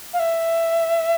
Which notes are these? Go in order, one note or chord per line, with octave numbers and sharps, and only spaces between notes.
F5
E5